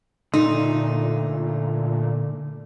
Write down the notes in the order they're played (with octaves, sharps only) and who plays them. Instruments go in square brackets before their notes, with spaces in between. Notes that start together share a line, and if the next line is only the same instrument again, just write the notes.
[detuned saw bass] A#2 [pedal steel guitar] D3 A3 C6 [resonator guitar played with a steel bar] D#4